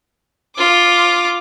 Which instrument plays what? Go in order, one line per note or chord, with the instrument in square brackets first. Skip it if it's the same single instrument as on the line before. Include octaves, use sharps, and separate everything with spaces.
[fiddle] F4 D6